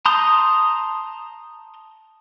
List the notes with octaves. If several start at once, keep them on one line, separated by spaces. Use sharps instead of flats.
A5 A#5 C6 D#6 G6